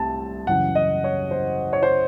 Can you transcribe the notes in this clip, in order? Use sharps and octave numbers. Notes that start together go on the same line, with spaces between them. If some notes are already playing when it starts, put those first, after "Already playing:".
Already playing: C2 A3 C4 A5
F#2 C#3 E3 F#5
D#5
C#5
C5
C#5
C5